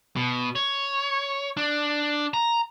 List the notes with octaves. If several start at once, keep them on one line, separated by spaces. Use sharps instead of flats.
B2
C#5
D4
A#5